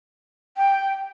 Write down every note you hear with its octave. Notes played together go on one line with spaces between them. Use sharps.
G5